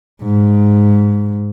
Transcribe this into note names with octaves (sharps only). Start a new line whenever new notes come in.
G#2